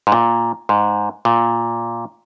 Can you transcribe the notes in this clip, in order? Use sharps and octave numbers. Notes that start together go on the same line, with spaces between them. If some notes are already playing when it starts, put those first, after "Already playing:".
G#2
A#2
G#2
A#2